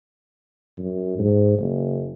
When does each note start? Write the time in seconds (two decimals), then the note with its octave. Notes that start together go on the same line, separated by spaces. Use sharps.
0.78 F#2
1.19 G#2
1.58 F#1